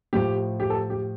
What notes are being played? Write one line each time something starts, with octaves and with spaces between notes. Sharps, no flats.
A2 F3 G4
G4
A4
G4